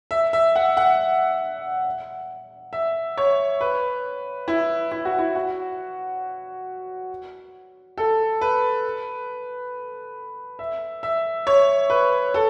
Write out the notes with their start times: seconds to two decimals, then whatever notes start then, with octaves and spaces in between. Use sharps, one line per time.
0.11 E5
0.33 E5
0.56 F#5
0.77 F#5
2.73 E5
3.17 C#5
3.61 B4
4.48 E4
4.92 E4
5.05 F#4
5.19 E4
5.35 F#4
7.98 A4
8.41 B4
10.59 E5
11.03 E5
11.47 C#5
11.90 B4
12.34 A4